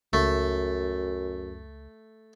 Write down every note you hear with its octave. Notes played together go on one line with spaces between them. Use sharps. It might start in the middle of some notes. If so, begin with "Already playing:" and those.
C#2 F#2 A3